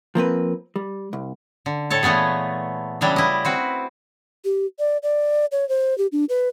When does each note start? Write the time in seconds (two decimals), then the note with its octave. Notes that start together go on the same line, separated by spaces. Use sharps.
0.15 F3 A#3 C4 B4
0.76 G3
1.13 C2
1.66 D3
1.90 A2 A4 C#5 A5
2.03 A#2 E3 A3 B3 G#4
3.01 C#3 E3 F#3 G3 D4 G4
3.16 E4 D#5
3.45 C4 F#4 B4
4.45 G4
4.79 D5
5.03 D5
5.52 C#5
5.69 C5
5.98 G4
6.12 D4
6.29 B4